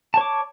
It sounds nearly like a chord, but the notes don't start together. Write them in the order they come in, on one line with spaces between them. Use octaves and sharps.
A5 C#5 D6